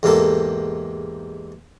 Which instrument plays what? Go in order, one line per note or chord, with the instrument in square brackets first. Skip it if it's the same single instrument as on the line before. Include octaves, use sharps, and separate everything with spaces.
[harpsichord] E2 G#2 C3 A#3 A4